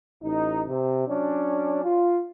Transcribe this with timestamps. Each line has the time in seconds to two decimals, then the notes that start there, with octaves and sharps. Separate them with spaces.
0.23 A1 D#4
0.68 C3
1.08 F#3 C#4 D4
1.84 F4